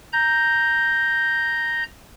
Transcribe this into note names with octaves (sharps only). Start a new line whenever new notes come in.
A#5 G6